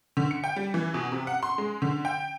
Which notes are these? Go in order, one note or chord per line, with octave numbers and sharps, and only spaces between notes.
D3
C#7
G5
G3
E3
B2
C3
F#5
C6
G#3
D3
G5